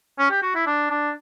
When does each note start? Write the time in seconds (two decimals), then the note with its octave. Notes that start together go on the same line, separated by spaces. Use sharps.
0.19 C#4
0.31 G4
0.42 F#4
0.55 E4
0.67 D4
0.91 D4